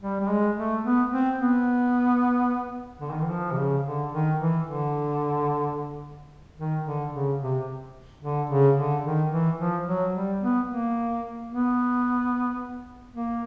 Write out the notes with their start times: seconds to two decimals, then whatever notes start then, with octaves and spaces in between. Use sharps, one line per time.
0.02 G3
0.21 G3
0.29 G#3
0.56 A3
0.84 B3
1.11 C4
1.38 B3
3.00 D3
3.11 D#3
3.21 E3
3.30 F3
3.52 C3
3.57 C#3
3.85 D3
4.12 D#3
4.39 E3
4.67 D3
6.58 D#3
6.85 D3
7.13 C#3
7.40 C3
8.23 D3
8.50 C#3
8.77 D3
9.04 D#3
9.31 E3
9.59 F3
9.86 F#3
10.14 G3
10.41 B3
10.68 A#3
11.50 B3
13.15 A#3